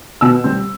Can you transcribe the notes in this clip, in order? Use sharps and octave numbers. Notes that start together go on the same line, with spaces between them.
B2 E6
G3 C4